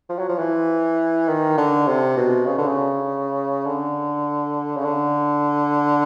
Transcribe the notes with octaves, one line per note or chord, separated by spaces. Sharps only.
F3
F#3
F3
E3
D#3
D3
C3
B2
C#3
D3
C#3
D3
C#3
D3